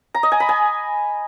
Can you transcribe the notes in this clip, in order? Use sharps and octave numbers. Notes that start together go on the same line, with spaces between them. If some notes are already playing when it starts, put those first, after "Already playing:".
A#5
D#5
G#5
B5
G#5